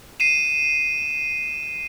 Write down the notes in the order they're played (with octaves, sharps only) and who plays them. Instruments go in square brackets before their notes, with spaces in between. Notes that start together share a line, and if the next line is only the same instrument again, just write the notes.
[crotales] C7 D#7 E7